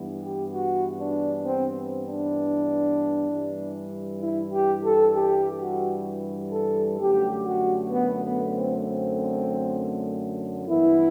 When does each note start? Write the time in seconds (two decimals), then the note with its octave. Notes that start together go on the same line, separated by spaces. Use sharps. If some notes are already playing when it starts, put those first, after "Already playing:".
Already playing: G2 E3 B3
0.22 G4
0.53 F#4
0.99 D4
1.45 C4
2.06 D4
3.29 G2 E3 G3
4.21 E4
4.52 G4
4.84 A4
5.14 G4
5.60 F#4
6.52 A4
6.98 F#2 D3 A3 G4
7.45 F#4
7.90 B3
8.21 B3
8.52 C4
8.83 C4
10.67 G2 E3 B3 E4